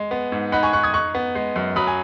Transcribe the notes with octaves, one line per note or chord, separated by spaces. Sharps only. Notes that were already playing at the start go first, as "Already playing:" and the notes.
Already playing: G#3
B3
G#2
D#4 F#5 B5
G#5 C#6
D#4 C#6 F#6
D#6 G#6
D#4 C#6 F#6
B3
G#3
F#2
F#3 B5 D#6
G#5